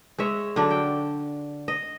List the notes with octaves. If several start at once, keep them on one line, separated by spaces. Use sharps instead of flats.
G#3 C#5 E5
D3 F#3 D4
G5
D#5